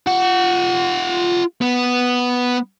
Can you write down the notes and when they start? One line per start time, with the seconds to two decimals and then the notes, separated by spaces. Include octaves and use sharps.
0.07 F4 F#5
1.62 B3